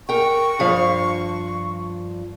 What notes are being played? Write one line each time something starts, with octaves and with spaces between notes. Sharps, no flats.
A#4 G5 C#6
G2 F3 F5